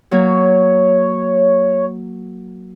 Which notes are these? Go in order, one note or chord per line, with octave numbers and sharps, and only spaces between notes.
F#3 A#3 C#5